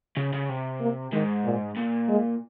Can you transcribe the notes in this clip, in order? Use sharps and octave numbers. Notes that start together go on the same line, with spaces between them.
C#3
C#3
C3
A#3
G#2 D#3
A#2
A#2
G#3